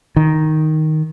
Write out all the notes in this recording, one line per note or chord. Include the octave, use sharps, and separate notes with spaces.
D#3